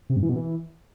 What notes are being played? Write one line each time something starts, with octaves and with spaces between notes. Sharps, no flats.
C3
G2
E3
B2
E3